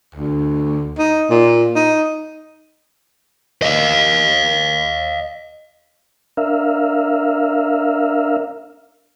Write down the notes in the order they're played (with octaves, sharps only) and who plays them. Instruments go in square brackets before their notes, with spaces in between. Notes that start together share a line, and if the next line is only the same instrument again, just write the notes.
[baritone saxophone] D2
D#4
A#2
D#4
[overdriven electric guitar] D#5 F5
[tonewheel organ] D4 A#4 E5 F5